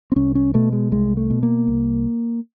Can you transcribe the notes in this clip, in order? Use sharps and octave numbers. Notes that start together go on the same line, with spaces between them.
C4
C2 C#4
C#4
B2 A3
G#3
C2 G#3
A3
B2
A#3
C2